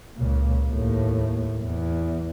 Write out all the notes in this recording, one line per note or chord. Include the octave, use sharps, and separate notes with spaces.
C#2 A#2
D#2 A2
E2